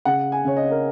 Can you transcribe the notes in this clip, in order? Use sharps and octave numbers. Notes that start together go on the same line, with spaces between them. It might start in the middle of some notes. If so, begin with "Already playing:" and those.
C#3 F#5
G#5
C#3 C#5
D#5
A#4